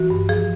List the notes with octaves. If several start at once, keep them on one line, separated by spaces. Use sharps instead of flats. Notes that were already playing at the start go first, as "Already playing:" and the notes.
Already playing: E3 F#4
G2
F3 G#4